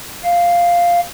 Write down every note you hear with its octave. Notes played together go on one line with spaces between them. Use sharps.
F5